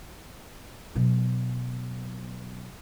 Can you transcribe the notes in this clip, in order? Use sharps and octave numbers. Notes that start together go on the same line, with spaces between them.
B2 F#3